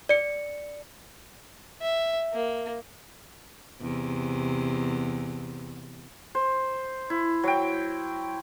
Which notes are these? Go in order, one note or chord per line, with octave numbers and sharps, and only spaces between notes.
D5 C#7
E5
A#3
E2 C3
C5
E4
F#3 G5